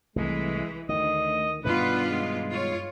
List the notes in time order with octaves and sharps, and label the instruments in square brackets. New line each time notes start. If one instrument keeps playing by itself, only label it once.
[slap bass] C2 A3 [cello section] E3 [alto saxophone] G#3
[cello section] D2 [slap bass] D#3 [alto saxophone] D#5
[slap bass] G2 B2 D#3 [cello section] B3 D4 F4 [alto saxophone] B4
[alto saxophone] G#3
[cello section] F4 C#5